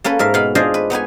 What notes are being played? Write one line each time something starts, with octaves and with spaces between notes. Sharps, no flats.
A#3 C#4 A4 B4
G#2 A#4 E5 F5
B2 F5 B5
D4 F4 G#4 C5 D#5 F5
B4
B3 D#4 B4 G#5